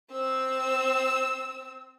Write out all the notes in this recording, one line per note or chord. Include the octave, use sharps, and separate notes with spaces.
C4 E6